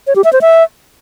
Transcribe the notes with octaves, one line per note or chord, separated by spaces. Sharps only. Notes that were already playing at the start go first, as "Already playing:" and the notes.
C#5
G4
E5
C5
E5